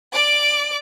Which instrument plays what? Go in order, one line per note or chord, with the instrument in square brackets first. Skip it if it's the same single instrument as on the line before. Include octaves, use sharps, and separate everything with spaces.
[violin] D5 D6